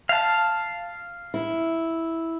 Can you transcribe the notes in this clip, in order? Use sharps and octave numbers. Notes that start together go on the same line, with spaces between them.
F5 A5
E4